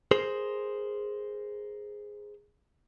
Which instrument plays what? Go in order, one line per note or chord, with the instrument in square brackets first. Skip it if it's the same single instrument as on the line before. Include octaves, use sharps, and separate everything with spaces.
[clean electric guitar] G#4 A#4 C5